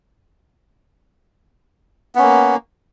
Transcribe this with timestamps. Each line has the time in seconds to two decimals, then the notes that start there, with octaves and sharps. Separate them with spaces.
2.15 B3
2.19 C#4
2.22 A#3